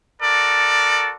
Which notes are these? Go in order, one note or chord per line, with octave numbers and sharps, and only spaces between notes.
F#4 A4 A#4 D5